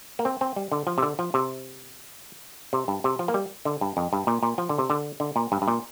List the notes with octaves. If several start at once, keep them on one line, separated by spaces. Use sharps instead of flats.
A#3
C4
C4
G3
D3
F3
C3
D3
F3
C3
C3
G2
C3
F3
A#3
G3
D3
G2
F2
G2
A#2
A#2
F3
D3
C3
D3
D3
A#2
G2
G2
A#2